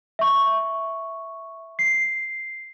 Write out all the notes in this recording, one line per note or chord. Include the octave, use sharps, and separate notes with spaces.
E5 C#6
C7